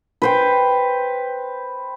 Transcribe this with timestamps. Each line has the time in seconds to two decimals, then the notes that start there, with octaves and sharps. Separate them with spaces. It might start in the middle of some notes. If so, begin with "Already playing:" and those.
0.22 B4 C5 G5